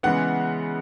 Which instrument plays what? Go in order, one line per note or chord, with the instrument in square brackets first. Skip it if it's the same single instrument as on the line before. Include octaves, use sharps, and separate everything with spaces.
[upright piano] C#3 E3 G#3 B3 F#5